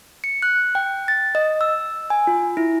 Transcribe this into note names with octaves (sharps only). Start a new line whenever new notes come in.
C#7
F#6
G5
A6
D#5
E6
G#5
F4
E4